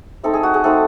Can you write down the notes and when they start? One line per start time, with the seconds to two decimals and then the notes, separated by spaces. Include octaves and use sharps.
0.24 A3 C4 D#4 A4
0.34 G#4
0.43 F#4
0.54 G#4
0.64 A3 C4 D#4 A4